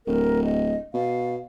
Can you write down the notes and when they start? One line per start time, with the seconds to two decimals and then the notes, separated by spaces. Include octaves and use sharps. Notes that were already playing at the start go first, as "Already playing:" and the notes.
0.06 D1 A#4
0.44 D#5
0.94 B2 F5